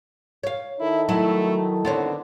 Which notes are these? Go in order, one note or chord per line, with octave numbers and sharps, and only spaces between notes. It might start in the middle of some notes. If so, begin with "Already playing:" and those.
C#5 F5
D#3 D#4 E4 A4
F#3 A3 E4
D3 B3 C4 C#5